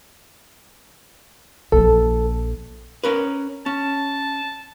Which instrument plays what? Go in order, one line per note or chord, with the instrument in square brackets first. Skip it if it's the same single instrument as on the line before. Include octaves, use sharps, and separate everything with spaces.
[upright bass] A#1 F3 [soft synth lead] A4
[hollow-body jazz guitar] C#4 A#4 B4
[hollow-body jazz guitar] C#4 [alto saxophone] A5